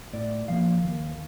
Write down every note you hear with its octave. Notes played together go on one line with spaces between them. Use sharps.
A2 D5
F3 A#3 F5
D#2